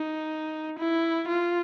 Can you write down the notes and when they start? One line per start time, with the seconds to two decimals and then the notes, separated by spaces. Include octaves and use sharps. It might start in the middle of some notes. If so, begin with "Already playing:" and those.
Already playing: D#4
0.79 E4
1.28 F4